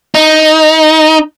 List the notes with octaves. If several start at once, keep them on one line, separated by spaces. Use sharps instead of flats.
D#4